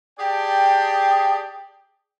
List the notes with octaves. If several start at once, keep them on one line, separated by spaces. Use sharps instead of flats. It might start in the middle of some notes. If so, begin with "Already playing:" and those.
G4 G#4 D5 G5 A5